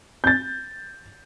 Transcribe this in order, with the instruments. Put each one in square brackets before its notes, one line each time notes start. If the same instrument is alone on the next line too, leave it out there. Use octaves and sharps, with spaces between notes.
[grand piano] G6 A6